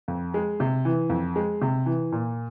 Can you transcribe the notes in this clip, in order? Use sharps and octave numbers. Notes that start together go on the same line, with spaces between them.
F2
G#3
C3
E3
F2
G#3
C3
E3
A#2